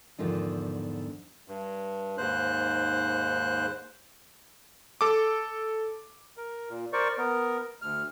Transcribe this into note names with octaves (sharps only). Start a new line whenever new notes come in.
E2 G#2 D3 D#3 F3
G2
D#2 G#2 C5 F#6
A4 D6
A#4
A#2
A#4 C5 D5 C#6
B3 A#4
D2 F6